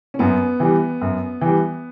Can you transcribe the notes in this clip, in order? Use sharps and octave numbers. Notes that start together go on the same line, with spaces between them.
C#4
F#2 B3
E3 G3
F#2
E3 G3